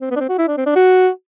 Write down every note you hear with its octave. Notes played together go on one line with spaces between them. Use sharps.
C4
B3
D4
C4
F#4
E4
D4
C4
D4
F#4